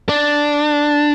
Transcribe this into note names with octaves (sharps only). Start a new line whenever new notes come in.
D4